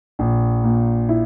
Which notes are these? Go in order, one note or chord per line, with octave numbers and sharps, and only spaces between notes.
A#1
A#2
E4